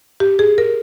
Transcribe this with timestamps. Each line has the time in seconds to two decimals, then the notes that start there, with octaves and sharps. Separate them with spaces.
0.20 G4
0.39 G#4
0.58 A#4